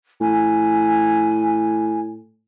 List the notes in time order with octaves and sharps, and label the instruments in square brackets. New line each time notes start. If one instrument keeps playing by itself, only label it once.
[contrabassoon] A2 [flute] G#5